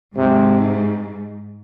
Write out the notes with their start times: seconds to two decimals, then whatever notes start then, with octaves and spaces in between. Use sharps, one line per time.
0.18 G#2 C3